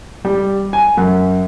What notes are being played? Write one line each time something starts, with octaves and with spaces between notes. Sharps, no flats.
G3
G#5
F#2